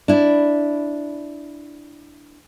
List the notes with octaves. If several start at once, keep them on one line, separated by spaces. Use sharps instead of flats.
D4 E4